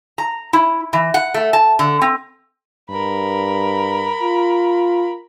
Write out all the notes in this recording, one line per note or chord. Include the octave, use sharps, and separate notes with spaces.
A#5
E4
E3
F#5
A3
A5
D3
C4
G2 A#4 B5
F4